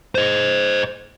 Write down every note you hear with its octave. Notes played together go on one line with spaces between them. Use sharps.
C5 D#5